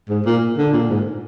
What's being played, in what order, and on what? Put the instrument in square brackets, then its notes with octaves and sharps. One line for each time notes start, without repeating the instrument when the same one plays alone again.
[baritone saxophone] G#2
A#2
D3
A#2
G#2